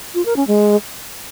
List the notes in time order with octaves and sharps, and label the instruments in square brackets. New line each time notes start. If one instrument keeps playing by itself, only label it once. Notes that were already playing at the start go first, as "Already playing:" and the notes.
[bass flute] F4
A#4
C#4
G#3